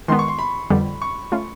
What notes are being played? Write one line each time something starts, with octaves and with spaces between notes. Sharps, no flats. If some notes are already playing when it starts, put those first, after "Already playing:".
D#3 G#3 B3 C6
C#6
C6
B5
F2 D3 G3 B3
C#6
A3 C#4 F4